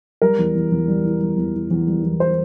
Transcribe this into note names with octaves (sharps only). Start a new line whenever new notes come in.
G3 A#4
E2
E2
E2
G3
E3
G3
E2
E3
E2
G3
E2
C5